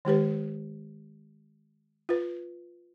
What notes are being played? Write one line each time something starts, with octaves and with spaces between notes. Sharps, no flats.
D#3 G#3 G4 B4
F4 B4